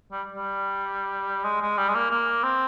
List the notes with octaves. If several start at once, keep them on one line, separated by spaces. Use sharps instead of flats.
G3
G3
G#3
G#3
G3
G#3
A#3
A#3
C4